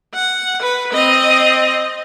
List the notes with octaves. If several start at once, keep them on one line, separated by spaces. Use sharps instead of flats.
F#5
B4
C4 D#5